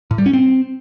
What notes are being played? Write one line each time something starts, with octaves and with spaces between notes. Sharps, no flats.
A2
G3
C#4
C4